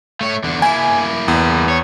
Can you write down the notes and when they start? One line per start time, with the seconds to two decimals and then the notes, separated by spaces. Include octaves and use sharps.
0.21 A3 C#5
0.44 E2 D3
0.62 A#3 E4 G#5
1.28 E2
1.69 C#5